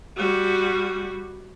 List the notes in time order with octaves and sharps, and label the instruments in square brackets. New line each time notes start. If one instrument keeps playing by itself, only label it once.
[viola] G3 F#4